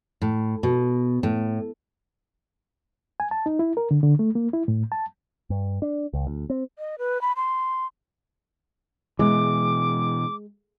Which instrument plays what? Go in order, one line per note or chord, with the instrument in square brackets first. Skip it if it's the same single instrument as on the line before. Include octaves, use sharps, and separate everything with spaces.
[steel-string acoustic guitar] A2
B2
A2
[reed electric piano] G#5
A5
D#4
E4
A#4
D3
D3
A3
A#3
E4
A2
A5
[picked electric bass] G2
D4
C#2
D2
C4
[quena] D#5
B4
B5
C6
[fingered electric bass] B2 E3 [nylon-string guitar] G#3 [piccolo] D6